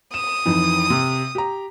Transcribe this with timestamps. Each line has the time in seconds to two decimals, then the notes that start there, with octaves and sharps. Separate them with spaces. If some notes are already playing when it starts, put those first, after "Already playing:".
0.14 D#6 E7
0.45 F2 E3 D#4
0.90 C3
1.35 G4 A#5